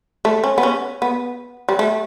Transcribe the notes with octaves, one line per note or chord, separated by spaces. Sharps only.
A3
C#4
B3
C#4
B3
G3
A3